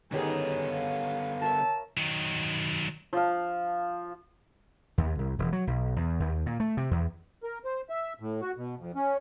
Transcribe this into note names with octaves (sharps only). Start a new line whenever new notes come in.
D3 D#3 B3 C#4 D#4 G4 G#4
F5
A#4 C#5 E5 A5
D#3 F#3
F3 F5
D#2
C2
E1
F#3
B1
E2
D#2
A#2
A3
C3
E2
A#4
C5
E5
A2
F#4
B2
F2
C#4